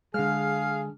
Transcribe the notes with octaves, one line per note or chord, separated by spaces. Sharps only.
D3 G#3 G#4 F5 F6